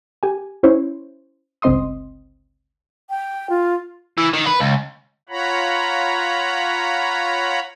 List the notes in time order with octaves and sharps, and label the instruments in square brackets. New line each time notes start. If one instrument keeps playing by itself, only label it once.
[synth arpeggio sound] G4 G#5
C#4 E4 C5 C#5
G1 C#2 C4 D#5 C6 D#6
[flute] G5
F4
[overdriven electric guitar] E3
D#3
B4
C#2
[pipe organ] F4 C#5 F#5 A#5 B5